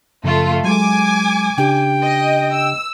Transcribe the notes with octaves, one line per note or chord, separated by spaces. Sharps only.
F#2 C#3 F3 A3 F4
F#3 G#3 G#5 D6
C#3 D4 G4 G5
D#5
E6